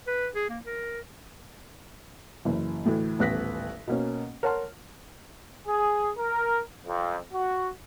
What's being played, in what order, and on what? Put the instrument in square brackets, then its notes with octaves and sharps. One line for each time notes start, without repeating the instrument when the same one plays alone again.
[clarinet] B4
G#4
A#3
A#4
[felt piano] F#1 E3
D2 A2 E3
D#1 A1 B3 F#6 A#6 B6
B2 A#3 C#4
A#4 C#5 F#5 A5 C6 F6
[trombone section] G#4
A#4
F2
F#4